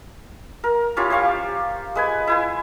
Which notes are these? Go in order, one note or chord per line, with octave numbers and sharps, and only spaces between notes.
A#4
C#4 E4 F4 G4
G4 C5 F5 C#6
G#3 B4 G#5
E4 G#5 C6